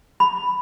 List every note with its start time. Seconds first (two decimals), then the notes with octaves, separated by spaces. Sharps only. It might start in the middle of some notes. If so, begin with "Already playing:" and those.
0.20 B5